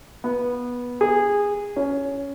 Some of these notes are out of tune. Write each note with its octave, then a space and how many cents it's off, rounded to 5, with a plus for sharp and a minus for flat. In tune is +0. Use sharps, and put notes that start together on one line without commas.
B3 -15
G#4 -20
C#4 +10